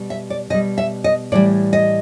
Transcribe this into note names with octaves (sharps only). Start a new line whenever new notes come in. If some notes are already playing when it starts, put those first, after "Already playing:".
Already playing: B2 G3
E5
D5
B2 G3 D#5
E5
D#5
A2 E3 G3 D5
D#5